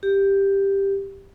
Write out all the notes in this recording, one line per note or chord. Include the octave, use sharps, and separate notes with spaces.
G4